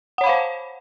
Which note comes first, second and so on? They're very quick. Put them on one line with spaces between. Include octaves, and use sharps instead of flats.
F#5 C#5 B5 F5 C5